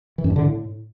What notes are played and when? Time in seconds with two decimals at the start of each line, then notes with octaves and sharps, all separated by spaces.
0.18 E3
0.24 F#2
0.30 G2
0.36 D3
0.42 A2